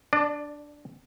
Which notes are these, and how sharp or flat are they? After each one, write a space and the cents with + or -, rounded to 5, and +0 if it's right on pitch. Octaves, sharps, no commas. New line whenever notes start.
D4 +0 D5 +30